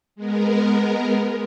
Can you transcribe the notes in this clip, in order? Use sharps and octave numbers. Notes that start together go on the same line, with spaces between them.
G#3 B3 A#4